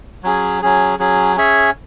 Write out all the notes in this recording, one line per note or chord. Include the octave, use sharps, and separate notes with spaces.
F#3 C#4 G#4
F#3 C#4 G#4
F#3 C#4 G#4
C#4 G#4 C#5 E5